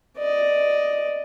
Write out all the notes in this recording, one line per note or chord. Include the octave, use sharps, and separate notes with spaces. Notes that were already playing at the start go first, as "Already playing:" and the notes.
D5 D#5